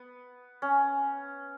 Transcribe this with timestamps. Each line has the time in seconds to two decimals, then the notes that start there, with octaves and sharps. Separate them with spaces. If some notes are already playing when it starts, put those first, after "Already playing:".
Already playing: B3
0.62 C#4